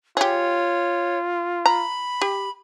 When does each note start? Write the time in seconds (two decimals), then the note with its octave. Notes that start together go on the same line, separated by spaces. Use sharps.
0.17 F4 G4 G#4 C#5
1.66 A#5 B5
2.21 G4